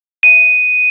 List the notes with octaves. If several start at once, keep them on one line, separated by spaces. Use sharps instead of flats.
D#7